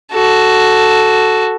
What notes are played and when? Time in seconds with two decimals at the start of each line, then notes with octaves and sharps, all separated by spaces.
0.12 F#4 A4